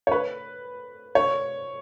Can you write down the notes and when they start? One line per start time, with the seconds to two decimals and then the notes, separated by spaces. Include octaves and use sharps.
0.07 C#5
0.12 B4
1.15 C#5